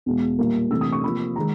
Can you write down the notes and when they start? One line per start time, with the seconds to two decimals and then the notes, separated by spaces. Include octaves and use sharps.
0.06 E2 B2 G#3
0.39 A#2 G3 A#3
0.71 C3 E3 A3 E6
0.81 D#6
0.92 C#6
1.04 C3 F3 A#3 B5
1.36 D#3 G#3 A#5